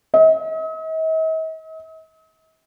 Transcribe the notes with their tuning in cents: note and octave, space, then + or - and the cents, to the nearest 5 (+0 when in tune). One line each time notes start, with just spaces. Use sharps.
D#5 +45